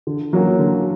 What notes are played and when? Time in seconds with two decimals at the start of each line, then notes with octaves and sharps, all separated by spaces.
0.07 D3
0.33 F#3 A#3 C#4 F#4
0.59 D3